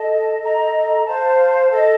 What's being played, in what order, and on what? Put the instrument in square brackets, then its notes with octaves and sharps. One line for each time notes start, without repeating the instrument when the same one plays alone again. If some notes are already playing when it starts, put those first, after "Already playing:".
Already playing: [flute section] A4 D#5 A5
A4 D#5 A#5
C5 F5 A5
A4 D#5 A5